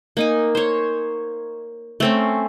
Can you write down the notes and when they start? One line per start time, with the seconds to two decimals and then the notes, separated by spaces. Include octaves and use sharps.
0.17 A#3 D#4 G#5
0.55 C5 C#5
2.00 A3 C4 C#4